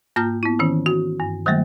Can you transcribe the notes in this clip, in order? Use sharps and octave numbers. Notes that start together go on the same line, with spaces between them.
G#2 A#3 F4 A#5 F6 G6
B3 E4
D#3 E3 C#4
F#4
G2
D#3 F#3 G3 A3 A#3